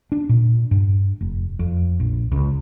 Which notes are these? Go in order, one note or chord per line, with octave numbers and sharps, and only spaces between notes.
D4
A#2
G2
F1
F2
A#1
C#2